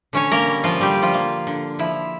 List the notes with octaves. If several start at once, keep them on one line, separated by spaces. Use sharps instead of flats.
D3 C#4 C#5
A#3 A#4
G3
F3 F4
D3 G3 G4
F3 F4
A#3
D3
F3 E4